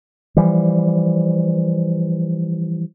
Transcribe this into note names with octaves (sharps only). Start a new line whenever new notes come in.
E3 F3 G3